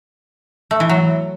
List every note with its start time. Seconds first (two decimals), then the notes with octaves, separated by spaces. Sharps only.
0.71 A3
0.80 E3
0.89 F#3